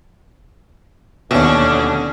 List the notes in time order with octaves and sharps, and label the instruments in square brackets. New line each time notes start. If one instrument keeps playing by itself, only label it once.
[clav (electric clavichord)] D#2 E5 [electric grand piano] B2 [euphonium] D3 [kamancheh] C#4 D4